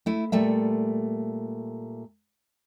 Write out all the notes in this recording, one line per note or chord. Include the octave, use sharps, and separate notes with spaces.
A3 E4
A#2 G3 A3 E5